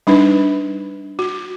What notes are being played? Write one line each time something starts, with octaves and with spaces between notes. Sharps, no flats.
G3 D4 D#4 B4
F#4